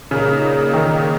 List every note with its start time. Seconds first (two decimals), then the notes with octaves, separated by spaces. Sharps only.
0.11 A#2 C#3 A#3 D#4
0.74 D#3